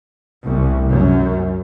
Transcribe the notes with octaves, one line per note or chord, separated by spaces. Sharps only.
C2
F#2